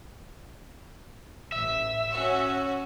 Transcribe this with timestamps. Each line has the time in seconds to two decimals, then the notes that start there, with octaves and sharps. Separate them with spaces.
1.52 A1 E5
2.12 C#4 F#4